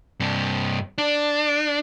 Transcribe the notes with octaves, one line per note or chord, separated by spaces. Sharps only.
G2 C3
D4